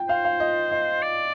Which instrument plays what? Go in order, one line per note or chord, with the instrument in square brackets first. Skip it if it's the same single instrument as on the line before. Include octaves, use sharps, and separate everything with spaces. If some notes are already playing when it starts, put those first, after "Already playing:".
Already playing: [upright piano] G5
[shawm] C5 [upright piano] F5
[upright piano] F5
D#5
D#5
[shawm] D5